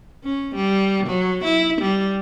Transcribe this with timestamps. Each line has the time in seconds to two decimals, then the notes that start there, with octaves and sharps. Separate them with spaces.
0.24 C#4
0.55 G3
1.06 F#3
1.44 E4
1.81 G3